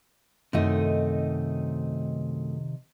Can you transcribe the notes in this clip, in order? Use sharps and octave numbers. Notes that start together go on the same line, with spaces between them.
F#2 C3 D#3 A3 D#4 D#5